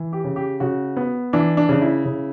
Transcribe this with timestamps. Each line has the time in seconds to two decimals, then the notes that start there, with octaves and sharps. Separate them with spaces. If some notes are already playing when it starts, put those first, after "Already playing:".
Already playing: E3
0.13 G4
0.24 C#3
0.36 G4
0.60 C#3 F#4
0.97 B3
1.33 E3 D4
1.57 D4
1.69 C#3 D4
1.82 E4
2.05 C#3